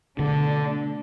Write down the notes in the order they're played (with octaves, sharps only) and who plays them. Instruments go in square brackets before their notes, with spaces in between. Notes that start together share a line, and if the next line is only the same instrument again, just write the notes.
[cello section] B2 A3 D4 [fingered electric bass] D3